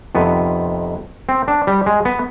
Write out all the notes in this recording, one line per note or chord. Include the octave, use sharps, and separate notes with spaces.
F2 C3 D#3 B3
C4
D4
G3
G#3
B3